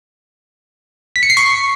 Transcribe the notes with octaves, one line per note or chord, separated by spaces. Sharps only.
B6
C#7
C7
C#6